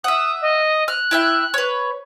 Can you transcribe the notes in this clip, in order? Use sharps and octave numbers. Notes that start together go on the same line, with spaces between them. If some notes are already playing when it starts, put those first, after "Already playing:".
E5 F#5 D#6
D#5
F6 F#6
E4 E5 G5
B4 C#5